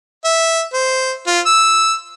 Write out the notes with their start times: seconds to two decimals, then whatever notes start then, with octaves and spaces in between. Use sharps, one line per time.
0.25 E5
0.74 C5
1.27 F4
1.46 E6